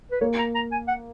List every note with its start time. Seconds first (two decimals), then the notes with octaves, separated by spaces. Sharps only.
0.11 B4
0.21 A#3 C#5
0.38 A#5
0.55 A#5
0.72 G#5
0.88 F#5